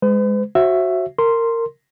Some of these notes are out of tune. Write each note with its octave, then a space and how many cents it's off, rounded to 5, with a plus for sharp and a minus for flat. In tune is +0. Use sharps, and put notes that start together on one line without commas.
G#3 -5 B4 +45
F#4 +0 C5 +40 E5 +15
A#4 -20 C6 +0